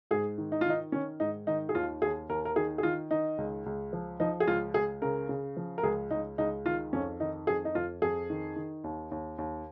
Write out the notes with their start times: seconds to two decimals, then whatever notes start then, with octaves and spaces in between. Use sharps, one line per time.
0.11 G#2 G#4
0.38 D#3
0.52 D#4
0.61 F4
0.66 D#3 D#4
0.92 D#3 C#4
1.20 G#2 D#4
1.47 D#3 D#4
1.69 G#4
1.75 D#2 F4
2.02 D#2 G#4
2.29 D#2 A#4
2.45 A#4
2.56 D#3 G#4
2.78 G#4
2.83 D#3 F4
3.11 D#3 D#4
3.38 C#2
3.66 C#2
3.93 F3
4.20 F3 D#4
4.40 G#4
4.48 C#2 F4
4.74 C#2 G#4
5.02 C#3 A#4
5.29 C#3
5.57 F3
5.78 A#4
5.83 C#2 G#4
6.11 C#2 D#4
6.38 C#2 D#4
6.66 D#3 F4
6.93 F2 C#4
7.20 D#3 D#4
7.47 F2 G#4
7.65 D#4
7.75 F2 F4
8.02 F2 G#4
8.30 D#3
8.56 D#3
8.84 D#2
9.11 D#2
9.38 D#2